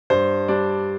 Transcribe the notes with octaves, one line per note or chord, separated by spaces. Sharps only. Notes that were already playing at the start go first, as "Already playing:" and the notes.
G2 C5
G3 D4 D5